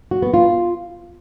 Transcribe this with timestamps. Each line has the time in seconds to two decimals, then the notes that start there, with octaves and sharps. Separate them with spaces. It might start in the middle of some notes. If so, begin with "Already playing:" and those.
0.11 F#4
0.22 B3
0.34 F4